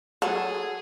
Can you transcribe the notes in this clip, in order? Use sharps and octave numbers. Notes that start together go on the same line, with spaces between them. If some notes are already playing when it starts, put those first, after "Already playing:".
F#3 G#4 A4